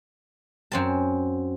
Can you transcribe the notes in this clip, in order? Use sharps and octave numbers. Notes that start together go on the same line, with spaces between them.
F#2 C4 A5